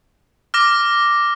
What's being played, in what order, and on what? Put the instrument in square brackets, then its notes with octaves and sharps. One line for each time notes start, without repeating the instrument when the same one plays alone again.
[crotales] D6 F6 A#6